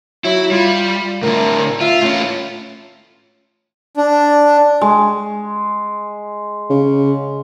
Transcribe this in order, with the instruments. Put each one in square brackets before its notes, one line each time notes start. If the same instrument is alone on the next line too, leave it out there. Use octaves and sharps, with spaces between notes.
[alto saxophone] F#3 [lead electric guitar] E4
[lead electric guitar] G3 [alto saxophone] F4
[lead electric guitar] A2 D3 [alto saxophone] A#4
[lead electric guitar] F4 [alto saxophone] E5
[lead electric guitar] A2 C#4 [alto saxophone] F4
[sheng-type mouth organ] D4
[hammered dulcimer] G#3
[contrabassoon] C#3